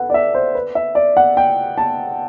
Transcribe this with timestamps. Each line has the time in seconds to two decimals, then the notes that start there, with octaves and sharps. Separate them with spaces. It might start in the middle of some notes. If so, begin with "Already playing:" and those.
Already playing: A4 B4 F#5
0.10 D5
0.14 E5
0.34 C5
0.55 B4
0.75 E5
0.95 D5
1.17 F#5
1.37 G5
1.78 A5